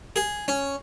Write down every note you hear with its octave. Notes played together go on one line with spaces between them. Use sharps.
G#4
C#4